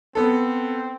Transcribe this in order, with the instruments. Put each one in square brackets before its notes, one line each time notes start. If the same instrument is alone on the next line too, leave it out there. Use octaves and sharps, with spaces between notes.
[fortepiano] B3 A4 [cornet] C4